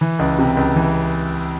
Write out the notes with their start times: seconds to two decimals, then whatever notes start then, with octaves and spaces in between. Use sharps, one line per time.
0.01 E3
0.19 C#2
0.39 C3
0.57 C#2
0.76 E3